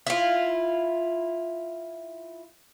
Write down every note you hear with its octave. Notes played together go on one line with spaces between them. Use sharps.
E4 F4